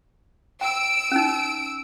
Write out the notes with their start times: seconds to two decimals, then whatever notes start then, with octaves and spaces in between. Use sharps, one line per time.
0.61 G5 E6 D7
1.11 C#4 D#4